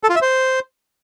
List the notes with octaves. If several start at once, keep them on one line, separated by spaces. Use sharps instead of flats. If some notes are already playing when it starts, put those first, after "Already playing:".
A4
F4
E5
C5